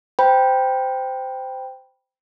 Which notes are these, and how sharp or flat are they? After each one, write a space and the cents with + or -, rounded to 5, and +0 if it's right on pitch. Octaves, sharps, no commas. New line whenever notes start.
C5 -15 G5 +0 B5 -20